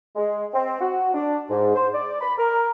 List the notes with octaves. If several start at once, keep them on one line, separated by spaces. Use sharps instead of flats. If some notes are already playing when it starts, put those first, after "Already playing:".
G#3
C4
F#4
D4
G#2
C5
D5
B5
A#4